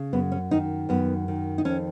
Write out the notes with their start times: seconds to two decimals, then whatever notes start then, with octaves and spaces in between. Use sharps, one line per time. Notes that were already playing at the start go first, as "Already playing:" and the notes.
Already playing: C#3
0.13 F#2 B3
0.32 C#4
0.51 D#3 D#4
0.89 F#2 B3
1.28 D#3
1.58 D#4
1.65 F2 C#4